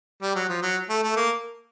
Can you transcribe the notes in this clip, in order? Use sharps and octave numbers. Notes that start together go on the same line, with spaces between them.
G3
F#3
F3
F#3
A3
A3
A#3